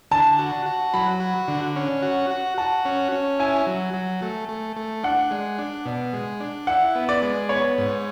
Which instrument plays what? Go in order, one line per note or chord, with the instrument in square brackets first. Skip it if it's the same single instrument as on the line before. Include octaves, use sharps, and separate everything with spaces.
[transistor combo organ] D3 [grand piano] A5
[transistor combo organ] F#4
F#4
[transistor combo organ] F#3 [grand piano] B5
[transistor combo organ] F#4
D3
C#4
F#4
F#4
[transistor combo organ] F#4 [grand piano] A5
[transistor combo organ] C#4
C#4
[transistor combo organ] E4 [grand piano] G#5
[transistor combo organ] F#3
F#3
A3
A3
A3
[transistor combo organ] D4 [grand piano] F#5
[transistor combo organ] G#3
D4
B2
G#3
D4
[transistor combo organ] E4 [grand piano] F#5
[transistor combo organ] B3
[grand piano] D5
[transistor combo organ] G#3
[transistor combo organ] B3 [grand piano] C#5
[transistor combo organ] G#2